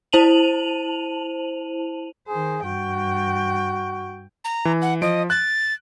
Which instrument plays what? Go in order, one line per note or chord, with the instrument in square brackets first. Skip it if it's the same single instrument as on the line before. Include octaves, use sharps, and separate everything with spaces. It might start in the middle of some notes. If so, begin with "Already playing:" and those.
[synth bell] E4 C5 A5 D#7 F7 F#7
[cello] D#3 C5 [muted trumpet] G#4
[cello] G2 G5 [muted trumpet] F#4
[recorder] A#5
[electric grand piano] E3
[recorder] F#5
[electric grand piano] F3 D7 [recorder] D#5
[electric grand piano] F#6 [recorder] A6